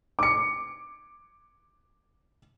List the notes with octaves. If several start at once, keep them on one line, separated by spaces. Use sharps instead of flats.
D6 C#7